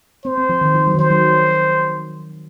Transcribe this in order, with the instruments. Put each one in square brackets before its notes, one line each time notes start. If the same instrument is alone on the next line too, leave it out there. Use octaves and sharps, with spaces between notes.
[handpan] C4 [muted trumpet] C5
[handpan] C4
F3
D#3
F3
F#3
D#3
[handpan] F3 [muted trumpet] C5
[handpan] F#3